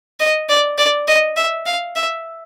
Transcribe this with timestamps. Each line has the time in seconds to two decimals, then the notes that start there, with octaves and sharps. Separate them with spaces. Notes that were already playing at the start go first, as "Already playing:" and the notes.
0.20 D#5
0.49 D5
0.78 D5
1.08 D#5
1.36 E5
1.66 F5
1.96 E5